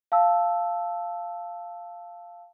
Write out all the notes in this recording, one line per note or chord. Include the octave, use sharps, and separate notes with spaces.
F5 A5 E6